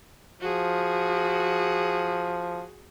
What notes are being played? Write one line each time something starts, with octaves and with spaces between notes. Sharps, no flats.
F3 F#4 G#4